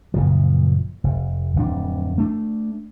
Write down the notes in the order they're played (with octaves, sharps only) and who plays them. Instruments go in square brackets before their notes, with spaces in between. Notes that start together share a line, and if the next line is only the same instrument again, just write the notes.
[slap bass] F#1 A#2 F3
F1
D1 F2 D4
A3 D4